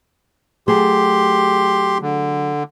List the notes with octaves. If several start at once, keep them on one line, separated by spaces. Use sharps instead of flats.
F#3 A3 G4 G#4 C6
D3